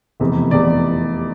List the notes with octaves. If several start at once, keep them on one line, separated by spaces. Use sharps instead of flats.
F1 E2 C3
F1 E2 C3 D5